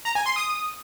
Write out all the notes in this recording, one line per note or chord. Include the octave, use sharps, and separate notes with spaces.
A#5
G#5
C6
D#6